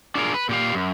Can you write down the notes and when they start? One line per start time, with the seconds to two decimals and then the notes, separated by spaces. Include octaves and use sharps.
0.15 D4 F4 G#4 A#4
0.34 B4
0.49 A#2 G4 F5
0.74 F#2